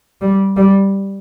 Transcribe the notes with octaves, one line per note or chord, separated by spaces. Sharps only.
G3
G3